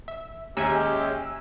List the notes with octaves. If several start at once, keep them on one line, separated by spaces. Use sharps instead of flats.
E5
D#2 G#3 C#4 G4 E5 G#5 E6